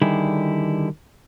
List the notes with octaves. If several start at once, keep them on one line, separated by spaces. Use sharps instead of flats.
D3 D#3 G3 D#4 E4 G#4